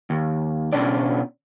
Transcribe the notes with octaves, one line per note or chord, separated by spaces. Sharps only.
D#2
B2 C#4 D4 D5